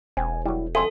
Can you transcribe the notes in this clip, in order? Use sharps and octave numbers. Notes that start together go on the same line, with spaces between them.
E1 C4 G#5
F#3 G3 E4
F2 A4 C5 E5 G#5 C6